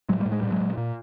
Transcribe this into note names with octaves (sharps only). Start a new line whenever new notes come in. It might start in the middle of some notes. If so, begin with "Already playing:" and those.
A2 F#3 G#3
G3 A3
A2
G#3
A#2 G3
F#3 G#3
A#2
A#2